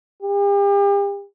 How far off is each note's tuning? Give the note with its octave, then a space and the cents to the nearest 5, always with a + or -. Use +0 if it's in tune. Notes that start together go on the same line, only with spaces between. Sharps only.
G4 +40